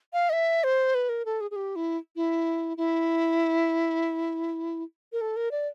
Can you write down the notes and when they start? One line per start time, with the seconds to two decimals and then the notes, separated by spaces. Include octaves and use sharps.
0.13 F5
0.29 D#5
0.33 E5
0.64 C5
0.95 B4
1.09 A#4
1.25 A4
1.41 G#4
1.51 G#4
1.56 G4
1.76 E4
2.16 E4
2.77 E4
5.12 A#4
5.21 A4
5.36 A#4
5.51 D5